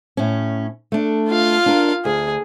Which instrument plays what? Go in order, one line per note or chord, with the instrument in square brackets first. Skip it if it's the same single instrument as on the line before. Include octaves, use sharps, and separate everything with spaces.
[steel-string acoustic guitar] A2 C#4
A3 D4
[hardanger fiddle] F4 F5
[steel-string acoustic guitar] D4 A#4
[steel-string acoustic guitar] D2 [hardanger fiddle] G#4